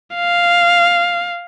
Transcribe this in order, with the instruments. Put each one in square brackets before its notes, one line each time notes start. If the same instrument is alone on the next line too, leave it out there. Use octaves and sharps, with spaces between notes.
[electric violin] F5